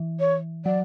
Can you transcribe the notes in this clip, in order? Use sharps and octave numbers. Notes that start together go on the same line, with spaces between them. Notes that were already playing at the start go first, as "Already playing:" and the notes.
Already playing: E3
C#5
F#3 D5